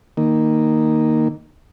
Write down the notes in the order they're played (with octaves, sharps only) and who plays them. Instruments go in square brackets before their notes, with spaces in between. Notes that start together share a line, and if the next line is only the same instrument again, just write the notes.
[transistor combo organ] D#3 A#3